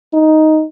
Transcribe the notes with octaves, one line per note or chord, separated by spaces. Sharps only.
D#4